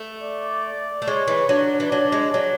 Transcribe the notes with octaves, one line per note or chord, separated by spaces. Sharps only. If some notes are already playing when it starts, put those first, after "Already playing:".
Already playing: A3
D5
A3
G#3 C#5
E3
F#3 D4
E3
F#3 D4
G#3
F#3